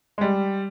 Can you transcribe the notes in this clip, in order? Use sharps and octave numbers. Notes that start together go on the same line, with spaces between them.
G#3
G3